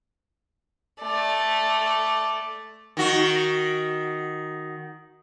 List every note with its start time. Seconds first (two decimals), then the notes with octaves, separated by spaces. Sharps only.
1.02 A3 D5
2.97 D#3 F#4